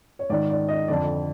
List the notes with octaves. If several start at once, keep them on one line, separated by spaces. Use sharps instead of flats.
C#5
G#2 D#3 D5
D5
D#5
F2 D3 D5